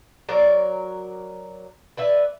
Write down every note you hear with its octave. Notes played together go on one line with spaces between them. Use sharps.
F#3 A#4 D5
B4 D5 E5